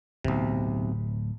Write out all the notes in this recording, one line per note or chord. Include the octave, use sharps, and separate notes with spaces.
D1 B1 C3